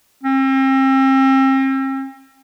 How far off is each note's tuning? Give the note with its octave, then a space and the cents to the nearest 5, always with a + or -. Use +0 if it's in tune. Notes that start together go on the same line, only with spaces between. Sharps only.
C4 +40